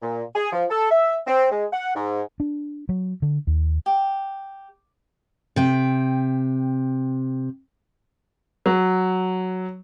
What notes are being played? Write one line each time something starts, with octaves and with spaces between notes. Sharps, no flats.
A#2
G#4
F3
A4
E5
C4
G#3
F#5
G#2
D4
F#3
D3
D#2
G4
C3 G5
F#3